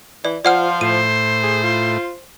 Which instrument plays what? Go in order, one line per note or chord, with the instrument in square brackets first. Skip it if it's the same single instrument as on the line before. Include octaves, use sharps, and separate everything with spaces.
[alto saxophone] E3 [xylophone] D5
[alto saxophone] F3 [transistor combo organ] F4 C5 [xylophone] D5 F#5 F6
[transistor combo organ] A2 [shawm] C5 [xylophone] D#7
[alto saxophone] G#4
F4